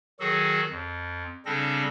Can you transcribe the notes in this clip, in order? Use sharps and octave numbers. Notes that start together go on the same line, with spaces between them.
D#3 F#3 F#4 G#4 A4
F2
C#3 G3 C4 D4 A4 A#6